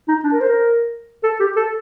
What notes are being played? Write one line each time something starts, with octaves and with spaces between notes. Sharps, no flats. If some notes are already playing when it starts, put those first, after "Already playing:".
D#4
D4
A#4
C5
A#4
A4
G4
A4